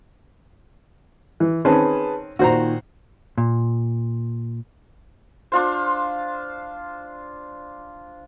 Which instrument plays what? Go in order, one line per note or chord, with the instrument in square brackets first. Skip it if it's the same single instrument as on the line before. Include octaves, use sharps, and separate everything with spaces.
[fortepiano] E3
[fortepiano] D#3 C4 C#4 [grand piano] G#4 B4 A5
[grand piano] A#2 D#3 [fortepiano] F#4 C5 A#5
[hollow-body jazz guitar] A#2
[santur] D4 F4 C5